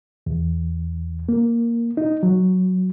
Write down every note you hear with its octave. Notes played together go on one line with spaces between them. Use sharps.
E2
A#3
D#4
F#3